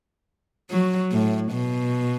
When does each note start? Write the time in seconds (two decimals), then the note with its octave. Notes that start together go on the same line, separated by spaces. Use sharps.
0.71 F#3
1.11 A2
1.52 B2